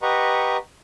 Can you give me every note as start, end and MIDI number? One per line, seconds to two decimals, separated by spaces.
0.02 0.57 67
0.02 0.57 71
0.02 0.57 75
0.02 0.57 78
0.02 0.57 82
0.02 0.57 85